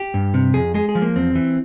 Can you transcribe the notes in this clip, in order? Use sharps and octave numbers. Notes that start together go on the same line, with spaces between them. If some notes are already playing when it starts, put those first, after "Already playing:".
Already playing: G4
G2
C3
F2 G#4
G#3 G#4
G#4
F3
A#3
E2 C4
E3